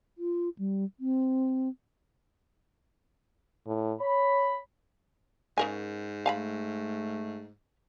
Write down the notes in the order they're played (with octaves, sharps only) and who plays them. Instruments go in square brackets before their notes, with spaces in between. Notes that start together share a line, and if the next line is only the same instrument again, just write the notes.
[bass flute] F4
G3
C4
[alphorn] A2
[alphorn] C#5 [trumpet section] B5
[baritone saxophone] G#2 [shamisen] C#3 A#4 G#5
[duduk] A3 [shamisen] F5 G#5 B5